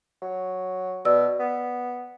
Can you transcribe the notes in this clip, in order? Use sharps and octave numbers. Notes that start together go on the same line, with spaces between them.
F#3
B2 D5 E6
B3